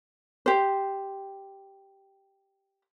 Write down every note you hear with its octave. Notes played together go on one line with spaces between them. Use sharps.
G4 C5